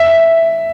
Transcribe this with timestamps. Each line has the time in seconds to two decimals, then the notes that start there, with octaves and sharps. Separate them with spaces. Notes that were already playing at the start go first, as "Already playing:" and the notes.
Already playing: E5